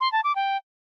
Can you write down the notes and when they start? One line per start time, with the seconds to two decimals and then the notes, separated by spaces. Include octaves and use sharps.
0.01 C6
0.12 A5
0.24 D6
0.35 G5